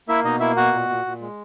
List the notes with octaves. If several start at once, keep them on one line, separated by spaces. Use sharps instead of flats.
A#3 E4 E5
B2 D#4 D#5
A#3 E4 E5
B2 F#4 F#5
A#2
A#2
A#2
G#3